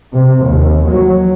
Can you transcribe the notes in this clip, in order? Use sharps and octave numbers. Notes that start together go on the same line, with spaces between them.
C3
D#2
F#3